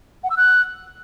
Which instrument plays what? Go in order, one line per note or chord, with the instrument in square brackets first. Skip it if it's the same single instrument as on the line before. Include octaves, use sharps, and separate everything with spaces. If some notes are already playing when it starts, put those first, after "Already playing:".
[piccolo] F#5
E6
F#6